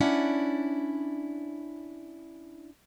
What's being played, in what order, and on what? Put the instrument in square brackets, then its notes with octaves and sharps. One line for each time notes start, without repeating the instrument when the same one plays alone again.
[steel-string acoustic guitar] C#4 D4 E4 D5 F#5